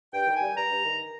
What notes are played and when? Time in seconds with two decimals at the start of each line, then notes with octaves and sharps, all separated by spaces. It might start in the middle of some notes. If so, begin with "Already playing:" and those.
0.13 G2 G5
0.27 D#3
0.35 G#5
0.41 G3
0.56 G2 A#5
0.71 G2
0.85 D#3